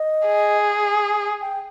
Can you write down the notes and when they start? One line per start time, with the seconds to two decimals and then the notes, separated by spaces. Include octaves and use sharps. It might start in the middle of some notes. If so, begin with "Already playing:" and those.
Already playing: D#5
0.25 G#4
1.41 G5